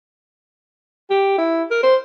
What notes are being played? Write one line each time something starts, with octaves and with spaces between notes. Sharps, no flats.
G4
E4
A#4
C5